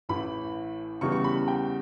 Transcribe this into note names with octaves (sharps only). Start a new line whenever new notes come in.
A1 A2 E3 B5
E2 C#3 G3 B3 E4 C#6
C#6
B5
G5